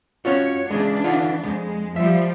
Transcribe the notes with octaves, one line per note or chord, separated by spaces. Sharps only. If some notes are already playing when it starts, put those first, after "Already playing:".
C#4 F4 F#4 C#5
C#3 E3 G#3 D4
D3 D#4 F4
C2 F2 G#3
F3 G3 E5